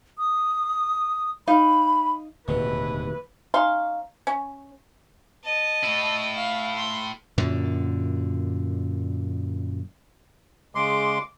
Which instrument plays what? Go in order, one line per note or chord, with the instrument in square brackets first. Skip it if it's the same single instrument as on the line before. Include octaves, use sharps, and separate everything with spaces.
[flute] D#6
[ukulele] D#4 F5 [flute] B5
[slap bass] D1 D#2 F#3 [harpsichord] B2 [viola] E3 B4
[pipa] C#4 D#4 F5 C6
C#4
[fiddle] D#5 A5
[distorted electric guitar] A2 E4
[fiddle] F5
C6
[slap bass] F#2 A#2 D3
[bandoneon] C#3 G#3 C6 [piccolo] D6